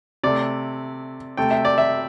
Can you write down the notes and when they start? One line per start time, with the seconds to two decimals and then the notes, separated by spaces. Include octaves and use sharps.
0.23 C3 A3 D5
1.37 C3 A3 G5
1.51 E5
1.65 D5
1.78 E5